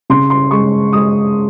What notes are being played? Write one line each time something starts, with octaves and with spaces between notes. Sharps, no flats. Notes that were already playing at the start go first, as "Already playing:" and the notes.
C#3 C6
C6
G#3 C#6
G#3 D#6